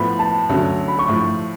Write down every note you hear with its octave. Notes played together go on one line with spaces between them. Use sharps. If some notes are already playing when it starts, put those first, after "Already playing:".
Already playing: A2 F3 B3 B5
A5
D2 D3 F#3 C#4
B5
C#6
A2 F3 A3